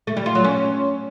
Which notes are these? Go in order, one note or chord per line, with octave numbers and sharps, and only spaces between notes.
A3
G3
F4
F#3
C#4